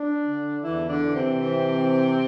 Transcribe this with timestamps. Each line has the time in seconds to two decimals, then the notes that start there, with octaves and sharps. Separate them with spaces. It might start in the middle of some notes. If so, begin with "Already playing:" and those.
Already playing: D4
0.26 D3
0.63 E2 E3 E4
0.89 D3 D4
1.02 E3
1.14 C3 C4
1.40 E3
1.79 E3